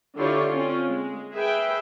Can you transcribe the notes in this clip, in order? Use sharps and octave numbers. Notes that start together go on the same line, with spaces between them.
D3 E4 F4 G4 C#5 C6
C4 C#4 F4
G#3
G#4 B4 E5 G5